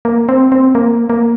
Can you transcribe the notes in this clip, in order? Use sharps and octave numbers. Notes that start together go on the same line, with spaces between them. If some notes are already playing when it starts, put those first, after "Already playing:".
A#3
C4
C4
A#3
A#3